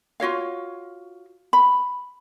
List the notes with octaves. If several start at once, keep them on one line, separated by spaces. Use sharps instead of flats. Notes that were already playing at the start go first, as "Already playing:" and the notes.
F4 F#4 C#5 F5
B5